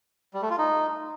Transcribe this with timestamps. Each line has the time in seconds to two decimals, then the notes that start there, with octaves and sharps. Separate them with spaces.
0.34 G3
0.42 A3
0.50 F4
0.58 D#4